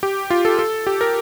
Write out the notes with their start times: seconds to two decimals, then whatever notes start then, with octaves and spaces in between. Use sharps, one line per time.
0.03 G4
0.30 F4
0.45 A4
0.59 A4
0.87 G4
1.01 A#4